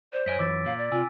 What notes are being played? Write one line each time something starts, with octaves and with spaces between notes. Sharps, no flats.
C5 D5
F#2 C#5 D#5 G#5 B6 D7
F#2 E3 D6 E6 A6
A#2 F5
D5
C3 F4 G#5 E6